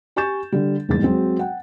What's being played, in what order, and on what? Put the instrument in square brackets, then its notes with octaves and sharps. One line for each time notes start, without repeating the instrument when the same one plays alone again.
[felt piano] G4 G#5 C#6 G6 A6 E7
D3 G3
D#1 E2 G#2 A6
F#3 G#3 C4 F#4
F#5 G5